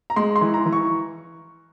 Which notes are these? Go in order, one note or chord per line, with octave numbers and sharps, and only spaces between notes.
A#5
G#3 C6
C6
E3
A#5
E3
C#6